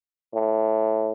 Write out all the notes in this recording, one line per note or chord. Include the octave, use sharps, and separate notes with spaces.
A2